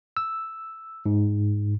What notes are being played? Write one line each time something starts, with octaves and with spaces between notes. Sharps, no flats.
E6
G#2